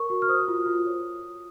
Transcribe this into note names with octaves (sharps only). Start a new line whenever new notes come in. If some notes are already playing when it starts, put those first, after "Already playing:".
Already playing: A#4 C#5 C#6
F#4
F6
C5 D#6
F4
F4
C#5